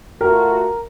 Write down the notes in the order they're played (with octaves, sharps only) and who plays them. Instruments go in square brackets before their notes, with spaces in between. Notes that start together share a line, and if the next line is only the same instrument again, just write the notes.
[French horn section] A3 F4 F#4 [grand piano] A#4